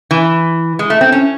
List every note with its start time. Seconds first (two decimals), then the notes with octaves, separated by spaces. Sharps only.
0.11 E3
0.79 G#3
0.90 A3
1.01 C4
1.12 C#4